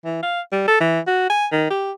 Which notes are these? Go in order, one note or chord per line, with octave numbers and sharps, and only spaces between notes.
E3
F5
G3
A4
E3
F#4
G#5
D#3
G4